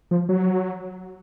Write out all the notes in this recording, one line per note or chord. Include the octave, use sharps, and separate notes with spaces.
F3
F#3